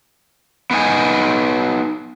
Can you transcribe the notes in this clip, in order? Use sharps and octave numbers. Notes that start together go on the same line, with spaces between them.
B3 D4 D#4 G#5